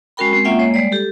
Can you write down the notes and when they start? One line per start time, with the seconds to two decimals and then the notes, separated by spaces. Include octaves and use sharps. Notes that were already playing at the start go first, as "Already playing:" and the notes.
0.17 G#3 C#4 F#4 A#4 G5 B5
0.32 G#3 C4
0.45 A#3 C#4 F4 E5 F#5 G5
0.59 G#3 A#3 C#5 D#5
0.74 G3 G#3 D5
0.92 G4 A4